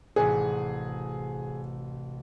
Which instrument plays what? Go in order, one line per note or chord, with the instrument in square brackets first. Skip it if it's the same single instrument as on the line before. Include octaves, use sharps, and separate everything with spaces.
[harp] A1 C3 F#4 [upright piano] G#4